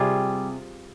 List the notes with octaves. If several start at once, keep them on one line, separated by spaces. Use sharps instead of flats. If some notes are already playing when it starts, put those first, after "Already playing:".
Already playing: C3 G3 F4 G#4